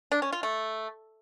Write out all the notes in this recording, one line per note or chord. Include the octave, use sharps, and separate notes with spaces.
D4
C#4
F4
A3